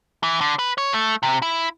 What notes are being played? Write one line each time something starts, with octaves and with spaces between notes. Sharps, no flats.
E3
D3
B4
C#5
A3
C3
E4